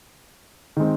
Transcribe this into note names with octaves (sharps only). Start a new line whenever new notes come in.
D#3 G#3 C4